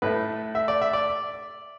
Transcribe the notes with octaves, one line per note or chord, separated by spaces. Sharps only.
A2 A3 B4
E5
D5
E5
D5